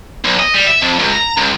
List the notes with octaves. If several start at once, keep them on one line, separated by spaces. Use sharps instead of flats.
B1
D#5
G3
E5
F2
C#2
A#5
C#2